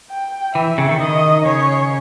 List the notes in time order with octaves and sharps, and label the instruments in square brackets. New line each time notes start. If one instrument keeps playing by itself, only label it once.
[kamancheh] G5
[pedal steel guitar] E3 [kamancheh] E5
[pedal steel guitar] C#3
D#3
[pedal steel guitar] D#3 [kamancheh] D#5
[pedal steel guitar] C#3 [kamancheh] C#5